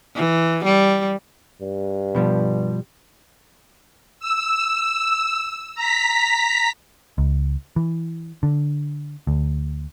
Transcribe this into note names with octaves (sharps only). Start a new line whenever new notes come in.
E3
G3
G2
B2 F3 G3
E6
A#5 B6
C#2
E3
D3
D2